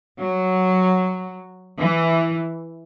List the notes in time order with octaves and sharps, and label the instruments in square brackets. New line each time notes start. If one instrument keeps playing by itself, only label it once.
[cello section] F#3
E3